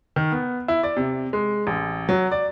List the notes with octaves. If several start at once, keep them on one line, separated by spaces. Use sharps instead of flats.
D#3
B3
E4
D5
C3
G#3
A1
F#3
D5